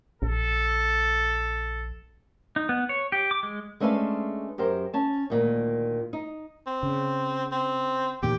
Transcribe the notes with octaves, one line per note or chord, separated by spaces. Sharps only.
A#1 A4
D#4
B3
C#5
G4
D6
G#3
G#3 A3 C#4 D4 B4 F5
F#2 G4 A#4 C5
C#4 A5
D2 A#2 D#3
D#4
C4
C#3
C4
E2 A#2 D#3 G4